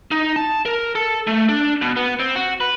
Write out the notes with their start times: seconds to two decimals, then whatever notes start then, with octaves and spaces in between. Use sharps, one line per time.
0.11 D#4
0.36 A5
0.66 A#4
0.95 A4
1.27 A3
1.49 D4
1.81 B2
1.97 B3
2.20 C4
2.36 F#4
2.61 B4